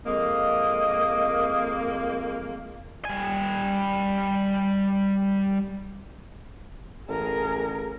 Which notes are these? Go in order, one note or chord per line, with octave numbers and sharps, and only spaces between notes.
F2 G#3 A#3 D#5
G3 G#5
A1 G#4 A#4